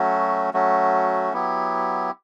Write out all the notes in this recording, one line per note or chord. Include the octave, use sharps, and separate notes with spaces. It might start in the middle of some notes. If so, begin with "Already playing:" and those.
Already playing: F#3 A3 C#4 F#4
F#3 A3 C#4 F#4
F#3 B3 E4 G4